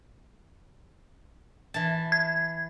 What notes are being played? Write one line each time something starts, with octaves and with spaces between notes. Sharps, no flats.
E3 A5
G#6